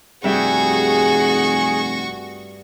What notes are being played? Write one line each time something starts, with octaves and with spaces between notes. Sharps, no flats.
F1 G2 F#4 G#4 E5 G5 C#6